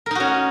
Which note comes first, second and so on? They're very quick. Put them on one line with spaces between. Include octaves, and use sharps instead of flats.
A#4 D#4 F#4 C#4